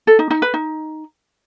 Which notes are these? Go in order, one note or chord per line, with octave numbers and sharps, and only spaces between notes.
A4
D#4
D#4
B4
D#4